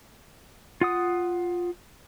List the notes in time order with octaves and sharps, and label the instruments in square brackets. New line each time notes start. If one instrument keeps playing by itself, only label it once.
[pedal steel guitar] F4 F#5 D#6